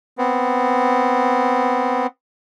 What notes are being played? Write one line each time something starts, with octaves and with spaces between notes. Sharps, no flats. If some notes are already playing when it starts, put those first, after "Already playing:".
B3 C4